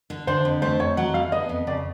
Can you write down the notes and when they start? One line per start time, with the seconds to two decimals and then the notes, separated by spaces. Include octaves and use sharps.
0.10 D3
0.27 D3 C5
0.45 F2
0.62 A3 C5
0.80 F2 C#5
0.97 F#3 F#5
1.14 D3 F5
1.32 B3 D#5
1.49 F2
1.67 C#3 D5